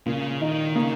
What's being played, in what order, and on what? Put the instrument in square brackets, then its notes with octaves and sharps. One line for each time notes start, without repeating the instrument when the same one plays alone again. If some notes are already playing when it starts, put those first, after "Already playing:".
[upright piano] A#2 [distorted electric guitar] C#3
[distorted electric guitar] D#3 [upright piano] D#4
[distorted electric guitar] C#3 [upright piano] A#3